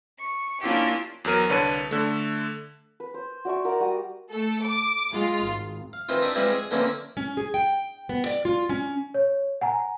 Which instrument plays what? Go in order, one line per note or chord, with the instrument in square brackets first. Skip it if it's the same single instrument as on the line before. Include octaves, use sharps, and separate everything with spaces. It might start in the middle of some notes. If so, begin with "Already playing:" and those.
[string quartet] C#6
A#3 C#4 D4 E4 F4 G4
[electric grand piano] E2 F#3 A#4 D#7
C2 D3 B4 C#5 A5 D#7
D3 A3
[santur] B4
C5
F#4 D5 E5 C#6
A#4 D5 F#5
G3 F#4 D#6
[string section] A3 A4
D6
G#3 F4
G#1
[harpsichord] F5
D#3 E3 C4 F4
D4 G4 E5 D#6
E3 G3 G#3 C4 E4 F4
G#4
D3 E3 A#3 C4 C#4
[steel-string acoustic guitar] C#4
G#4
G5
B3
D5
F4
C#4
[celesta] C#5
F#5 G#5 A#5